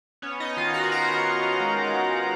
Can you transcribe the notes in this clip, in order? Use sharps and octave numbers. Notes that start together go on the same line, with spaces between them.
B3 C#4 C#5
D#4 D#5
D#3 F4 F5
F#4 F#5
B3 A#4 A#5
B3
G#3
G#3